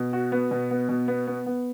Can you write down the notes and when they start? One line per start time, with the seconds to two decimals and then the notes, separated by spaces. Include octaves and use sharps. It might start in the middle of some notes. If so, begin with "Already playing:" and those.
Already playing: B2
0.13 F#4
0.32 B3
0.51 B2
0.71 B3
0.89 B2
1.08 B3
1.27 B3
1.46 B3